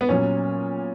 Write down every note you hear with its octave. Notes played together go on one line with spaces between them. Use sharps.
B3
A#2 F#3 C#4